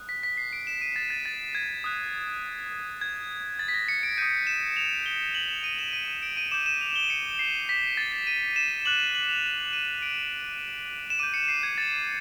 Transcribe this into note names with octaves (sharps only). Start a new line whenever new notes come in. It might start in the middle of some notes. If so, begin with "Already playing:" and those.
Already playing: D#6 F#6
B6
B6
C7
D7
E7
D#7
A6
A6
A6
G#6
D#6 F#6
G#6
A6
B6
A#6
C#7
D7
D#6 G6 D#7
E7
F7
G7
F#7
E7
D#7
E7
D#7
D#7
D7
D#7
D6 G6 E7
E7
F7
G7
C#7
C7
B6
A6
A6
D#7
E7
D6 F#6 F#7
F#7
F#7
F7
E7
D#7
D7
E7
D6 G6 D#7
C#7
C7
G#6
A6